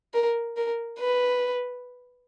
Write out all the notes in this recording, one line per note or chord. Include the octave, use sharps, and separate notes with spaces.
A#4
A#4
B4